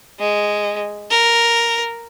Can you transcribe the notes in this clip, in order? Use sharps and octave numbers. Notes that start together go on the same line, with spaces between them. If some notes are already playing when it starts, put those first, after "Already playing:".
G#3
A#4